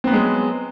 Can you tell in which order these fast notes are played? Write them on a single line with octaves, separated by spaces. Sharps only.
C4 B3 F#3 G#3